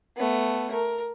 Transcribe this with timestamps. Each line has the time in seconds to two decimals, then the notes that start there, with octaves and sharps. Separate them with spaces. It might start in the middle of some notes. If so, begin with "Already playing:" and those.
0.17 A3 B3
0.72 A#4